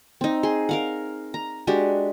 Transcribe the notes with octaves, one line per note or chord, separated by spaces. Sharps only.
C4 D#4
G#4 C6
A#4 F5 F#5
A#5
G#3 D4 F#4 G4